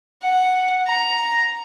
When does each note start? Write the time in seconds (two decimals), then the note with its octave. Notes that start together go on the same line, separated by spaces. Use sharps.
0.22 F#5
0.87 A#5